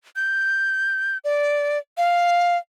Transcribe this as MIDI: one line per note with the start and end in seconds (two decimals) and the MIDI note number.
0.16 1.18 91
1.24 1.78 74
1.97 2.57 77